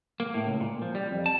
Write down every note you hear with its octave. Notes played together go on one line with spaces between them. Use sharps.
A#3
A2
C#2
A#2
F3
G3
F2
A5